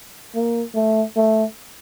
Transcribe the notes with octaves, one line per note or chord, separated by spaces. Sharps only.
A#3
A3
A3